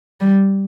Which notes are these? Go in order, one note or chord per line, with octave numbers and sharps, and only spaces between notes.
G3